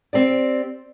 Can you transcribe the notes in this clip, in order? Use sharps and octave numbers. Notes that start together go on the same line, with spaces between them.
C4 G4 D5